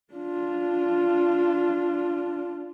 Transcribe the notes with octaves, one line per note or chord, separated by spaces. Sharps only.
D4 F4